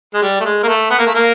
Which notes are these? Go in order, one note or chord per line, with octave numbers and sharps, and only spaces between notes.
G#3
G3
A3
G#3
A#3
A3
B3
A#3
A3
A#3